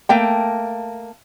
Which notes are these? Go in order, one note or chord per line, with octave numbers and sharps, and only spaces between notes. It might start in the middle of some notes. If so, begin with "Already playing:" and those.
A3 A#3 G5